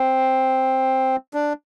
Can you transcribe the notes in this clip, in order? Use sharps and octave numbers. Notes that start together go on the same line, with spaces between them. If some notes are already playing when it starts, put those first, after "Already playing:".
Already playing: C4
D4